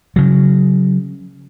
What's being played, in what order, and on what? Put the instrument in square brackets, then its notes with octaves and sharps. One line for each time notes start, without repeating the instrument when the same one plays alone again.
[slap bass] C#3 F#3